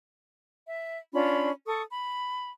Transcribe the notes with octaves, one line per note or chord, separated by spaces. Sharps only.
E5
C#4 D4 F4 B5
A4 C#6 D#6
B5